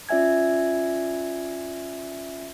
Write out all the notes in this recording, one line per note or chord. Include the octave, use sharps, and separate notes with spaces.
C#4 F4 D5 E5 G#5 G#6